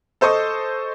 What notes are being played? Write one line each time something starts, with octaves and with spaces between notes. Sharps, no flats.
A4 C5 D#5 C#6 D#6